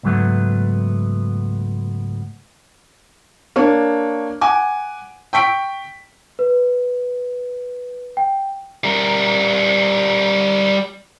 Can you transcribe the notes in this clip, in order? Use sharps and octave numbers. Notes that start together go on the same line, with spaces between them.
C#2 G#2 F#3 A3 B3
A#3 D4 C#5
F#5 G#5 D6
G5 C#6 B6 D7
B4
G5
G3 A#4